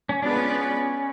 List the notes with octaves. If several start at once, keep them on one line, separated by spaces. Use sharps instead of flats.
C#4
G#3 B3 D4 F4 B4 D5
C#4